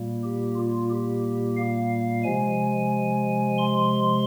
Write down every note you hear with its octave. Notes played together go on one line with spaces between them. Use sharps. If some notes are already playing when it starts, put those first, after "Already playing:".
Already playing: A#2 G3 A#3
G4
F4
G4
F5
C3 F3 G#3 G#5
C6